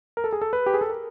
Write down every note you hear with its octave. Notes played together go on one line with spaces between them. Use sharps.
A#4
A4
G#4
A4
B4
G4
G#4
A4
A#4